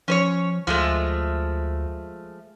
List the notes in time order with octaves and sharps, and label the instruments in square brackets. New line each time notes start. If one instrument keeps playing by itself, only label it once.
[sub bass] F3 [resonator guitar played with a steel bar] C#4 C5 C#5
[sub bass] D2 [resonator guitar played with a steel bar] F3 G#3 A3